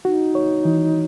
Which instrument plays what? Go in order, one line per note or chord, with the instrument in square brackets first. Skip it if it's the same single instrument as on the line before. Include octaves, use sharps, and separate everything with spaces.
[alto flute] D#4 [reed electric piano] F#4
[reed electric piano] C#5
E3